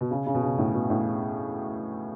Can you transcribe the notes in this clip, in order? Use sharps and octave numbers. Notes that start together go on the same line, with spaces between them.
B2
C#3
C#3
B2
C#3
A2
B2
A2